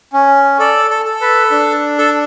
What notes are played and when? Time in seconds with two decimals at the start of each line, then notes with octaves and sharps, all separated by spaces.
0.13 C#4
0.59 A4 D5
0.90 A4
1.05 A4
1.21 B4
1.51 D4
1.98 A4